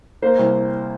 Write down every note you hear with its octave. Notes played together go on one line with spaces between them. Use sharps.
A#3 C5
C2